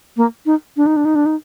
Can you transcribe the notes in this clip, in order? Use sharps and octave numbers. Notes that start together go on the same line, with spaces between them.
A#3
D#4
D4
D#4
D4
D#4
D4
D#4